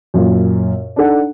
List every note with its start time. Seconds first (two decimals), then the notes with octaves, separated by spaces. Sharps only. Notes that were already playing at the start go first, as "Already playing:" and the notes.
0.14 F#2 A#2
0.96 D4 D#4 A4 F#5